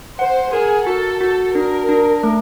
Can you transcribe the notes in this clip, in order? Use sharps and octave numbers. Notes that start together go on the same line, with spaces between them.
C5 F#5
G#4 A#4
F#4 A4
F#4
D4 A#4
D4
A3